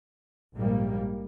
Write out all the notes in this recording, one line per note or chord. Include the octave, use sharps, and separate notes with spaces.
A#1 G#2 G3 A#3